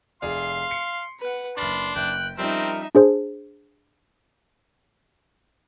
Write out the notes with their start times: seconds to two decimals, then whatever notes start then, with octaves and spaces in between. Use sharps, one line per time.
0.22 F1 G#4 D5 F5 C6
0.71 C#7
1.20 B4 F#5
1.57 F#1 D4 B5 C6 F6 A6
1.96 F#1 G5 F#6
2.38 F3 G3 C4 C#4 D#4 A#4 E5
2.95 D4 G#4 C5